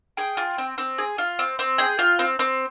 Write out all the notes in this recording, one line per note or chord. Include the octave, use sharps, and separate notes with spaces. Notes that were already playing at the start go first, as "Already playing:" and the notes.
G#4 G5
F4
C4
C4
G#4
F4
C4
C4
G#4 G5
F4
C4
C4